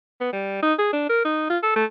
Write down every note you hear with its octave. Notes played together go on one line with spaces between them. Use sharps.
B3
G3
D#4
G#4
D4
A#4
D#4
F4
A4
A3